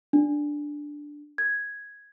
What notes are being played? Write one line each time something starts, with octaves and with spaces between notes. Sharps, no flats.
D4
G#6